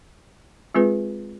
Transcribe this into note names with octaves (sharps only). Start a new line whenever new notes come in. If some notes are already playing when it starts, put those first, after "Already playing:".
G#3 C4 F4 G#4 B4